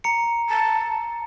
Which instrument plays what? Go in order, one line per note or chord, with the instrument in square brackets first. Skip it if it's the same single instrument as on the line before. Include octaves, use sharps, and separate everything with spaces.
[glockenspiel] A#5 C#7
[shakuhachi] A5